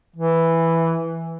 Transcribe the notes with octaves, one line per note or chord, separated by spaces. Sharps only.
E3